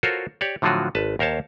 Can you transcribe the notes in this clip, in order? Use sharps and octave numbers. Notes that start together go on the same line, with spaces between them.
F4 F#4 A4 A#4 C5 C#5
G4 C#5 D5
A2 D3 F3 F#3 F4 F#4
G#1 B4 A5
D#2 A#4 C5 C#5 A5